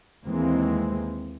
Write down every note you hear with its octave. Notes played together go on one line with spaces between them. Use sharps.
D#2 E3 G#3 A#3 C4